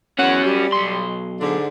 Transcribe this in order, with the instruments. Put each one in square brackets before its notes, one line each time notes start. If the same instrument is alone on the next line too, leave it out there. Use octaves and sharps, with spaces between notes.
[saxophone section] E2 F#5 [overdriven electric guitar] C#4 F#4
[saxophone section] G3
[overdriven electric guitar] B1 C6
[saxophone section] G#2 D3